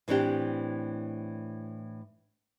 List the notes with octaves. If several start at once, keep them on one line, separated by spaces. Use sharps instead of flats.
A2 E3 C4 D4 G4